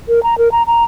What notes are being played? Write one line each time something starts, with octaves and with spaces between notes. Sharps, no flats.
A#4
A#5
A#4
A#5
A#5